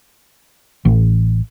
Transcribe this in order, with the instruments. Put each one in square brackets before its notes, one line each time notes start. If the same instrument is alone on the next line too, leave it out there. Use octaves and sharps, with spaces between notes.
[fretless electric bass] A1